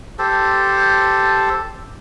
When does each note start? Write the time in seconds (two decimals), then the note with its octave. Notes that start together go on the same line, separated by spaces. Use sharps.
0.19 G4 A4 C5 A5